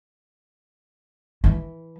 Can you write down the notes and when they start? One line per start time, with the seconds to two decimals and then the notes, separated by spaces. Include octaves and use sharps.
1.44 E3